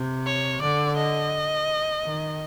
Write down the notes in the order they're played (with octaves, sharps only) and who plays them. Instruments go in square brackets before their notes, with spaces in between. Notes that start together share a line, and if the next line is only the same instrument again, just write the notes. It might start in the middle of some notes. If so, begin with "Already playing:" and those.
Already playing: [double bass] C3
[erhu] C#5
[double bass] D3 [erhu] D5
[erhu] D#5
[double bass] D#3